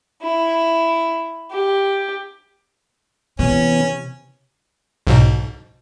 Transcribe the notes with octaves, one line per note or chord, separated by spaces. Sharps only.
E4
G4
C3 E3 B3 C#4
B1 G#2 B2